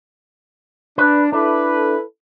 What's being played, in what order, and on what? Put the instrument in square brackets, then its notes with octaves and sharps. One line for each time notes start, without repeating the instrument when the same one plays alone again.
[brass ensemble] D4 [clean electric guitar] B4
[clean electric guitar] D4 [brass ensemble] E4 A4 B4